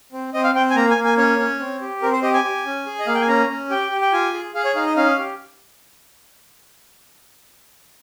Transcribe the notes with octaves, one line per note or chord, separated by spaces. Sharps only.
C4
C4 D#5
F5
C4 G5
G#5
A#3 A#5
G#5
A#3
G#5
C#4 C#5
C#4
C4
G4
C4 A#4
C5
G4 D#5
G#5
G4
C#4
G#4
D#5
A#3 F5
G5
G#5
C#4 A#5
C#4
G4 G5
G4
G5
F4 G#5
G#4
G#4 F5
C#5
D#4 F5
D#5
C#4 F5
G4